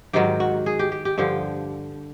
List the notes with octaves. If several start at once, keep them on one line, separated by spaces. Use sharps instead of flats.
G#2 D#3 F#3 G4
F#4
G#4
G4
G4
G4
G2 D3 F3 G4